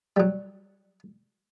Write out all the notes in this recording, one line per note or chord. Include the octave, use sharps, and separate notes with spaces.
F#3 G3